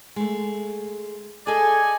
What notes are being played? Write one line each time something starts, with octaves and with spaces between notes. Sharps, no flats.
G#3 A3
G#4 A4 D5 D#5 G#5